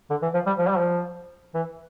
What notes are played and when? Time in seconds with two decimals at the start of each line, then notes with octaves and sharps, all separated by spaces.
0.10 D3
0.22 E3
0.34 F3
0.46 G3
0.58 F3
0.68 G3
0.78 F3
1.54 E3